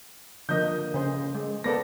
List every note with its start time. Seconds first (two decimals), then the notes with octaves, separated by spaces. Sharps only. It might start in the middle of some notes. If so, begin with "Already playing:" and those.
0.49 D3 F3 A#3 D#5 G6
0.94 C#3 C5
1.35 G#3
1.64 A#3 B3 A4 D5 A#6